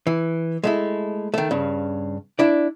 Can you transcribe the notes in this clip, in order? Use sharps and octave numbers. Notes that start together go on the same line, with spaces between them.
E3
G#3 A3 E4
D#3 A3
G2 C#3
D4 E4 D5